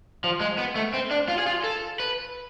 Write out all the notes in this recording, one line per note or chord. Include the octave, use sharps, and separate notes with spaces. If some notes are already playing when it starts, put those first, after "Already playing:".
F3
G#3
B3
A3
C4
D4
F4
G#4
F4
A4
B4